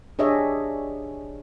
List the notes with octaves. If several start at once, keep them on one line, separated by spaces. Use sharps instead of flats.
D4 G4 G#4 C#5 D#5 E5